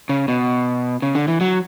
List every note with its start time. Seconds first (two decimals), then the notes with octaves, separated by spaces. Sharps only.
0.09 C#3
0.28 B2
1.02 C#3
1.15 D3
1.28 E3
1.41 F#3